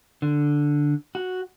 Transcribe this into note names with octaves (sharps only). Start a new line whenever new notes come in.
D3
F#4